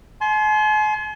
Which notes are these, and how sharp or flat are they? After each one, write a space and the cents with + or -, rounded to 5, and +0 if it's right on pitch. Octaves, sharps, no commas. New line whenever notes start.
G#5 +45 C6 +0